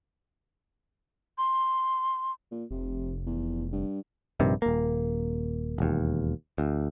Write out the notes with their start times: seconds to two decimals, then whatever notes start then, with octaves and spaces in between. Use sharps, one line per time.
1.38 C6
2.51 A#2
2.71 F1 C3
3.26 E2
3.72 G2
4.40 A#1 G2 C3 D#3
4.62 D#1 A#3
5.78 E1 D#2
6.58 D2